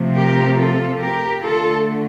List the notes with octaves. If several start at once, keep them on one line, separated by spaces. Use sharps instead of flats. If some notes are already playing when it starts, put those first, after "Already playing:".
Already playing: C3 F3 A3
G4 A#4
F4 A4
G4 A#4
D3 A3 F4 A4